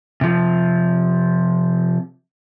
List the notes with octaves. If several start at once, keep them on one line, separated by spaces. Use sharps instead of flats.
C3 F3